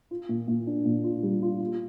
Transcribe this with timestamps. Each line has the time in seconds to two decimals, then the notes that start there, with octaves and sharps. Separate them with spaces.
0.11 F4
0.29 A#2
0.48 A#2
0.67 D4
0.85 A#2
1.04 F4
1.23 G3
1.42 F4
1.60 F4